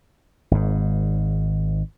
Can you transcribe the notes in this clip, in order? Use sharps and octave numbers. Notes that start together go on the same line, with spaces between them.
G#1 G#2